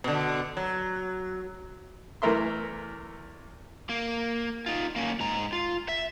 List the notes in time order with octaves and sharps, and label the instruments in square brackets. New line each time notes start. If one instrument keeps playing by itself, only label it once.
[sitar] B2 D3
F#3
[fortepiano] E2 E3 A3 A#4 E5 C6
[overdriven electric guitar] A#3
D#4 F4
A#3 C#4
G#2 A#5
F4
E5